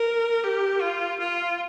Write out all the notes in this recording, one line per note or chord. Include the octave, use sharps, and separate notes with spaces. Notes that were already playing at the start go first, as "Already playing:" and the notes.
Already playing: A#4
G4
F4
F4